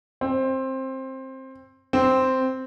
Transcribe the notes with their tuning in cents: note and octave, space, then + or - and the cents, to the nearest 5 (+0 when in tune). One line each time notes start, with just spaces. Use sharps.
C4 +15
C4 -5